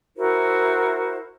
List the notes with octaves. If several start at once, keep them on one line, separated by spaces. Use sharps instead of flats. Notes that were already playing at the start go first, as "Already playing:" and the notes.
E4 F#4 A#4 C5